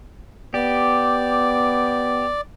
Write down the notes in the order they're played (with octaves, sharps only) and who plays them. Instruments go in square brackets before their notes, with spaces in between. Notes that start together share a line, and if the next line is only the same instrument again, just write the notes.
[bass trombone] B3 [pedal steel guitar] G4 [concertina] D5